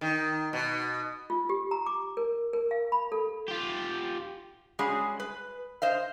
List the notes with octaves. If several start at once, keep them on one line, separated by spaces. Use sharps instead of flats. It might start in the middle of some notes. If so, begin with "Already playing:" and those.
D#3
B2
F4
G4
A#5
D6
A#4
A#4
F5
B5
A4
F4 G4
G3 G#3 C#4 F#4 G#4
B4
C5 D#5 F5